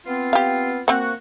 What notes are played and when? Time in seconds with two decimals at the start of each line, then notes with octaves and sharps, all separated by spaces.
0.06 B3 C4 F4
0.33 G4 F5
0.88 A#3 C4 F#4 F#5